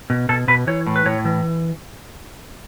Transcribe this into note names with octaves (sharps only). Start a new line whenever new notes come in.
B2
B2 A4
B2 B4
E3 C#5
A2
B4
A2 C#5
E3